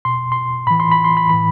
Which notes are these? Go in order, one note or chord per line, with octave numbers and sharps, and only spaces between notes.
B2 C6
C6
A2 E3 B5
C6
B5
C6
B5
A2 E3 B5